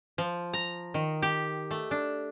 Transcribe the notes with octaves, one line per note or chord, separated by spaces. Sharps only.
F3
A#5
D#3
G4
A3
D4